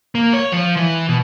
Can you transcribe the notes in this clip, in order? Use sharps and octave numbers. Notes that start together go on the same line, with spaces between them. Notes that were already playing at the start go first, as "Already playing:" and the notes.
A#3
C#5
F3
E3
B2